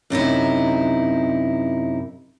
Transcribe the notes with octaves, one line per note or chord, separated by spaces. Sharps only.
F#2 C3 D#4 E4